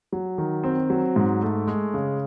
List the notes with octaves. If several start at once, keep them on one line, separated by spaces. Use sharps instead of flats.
F#3
D#3
C4
F#3
G#2
A3
G#3
C#3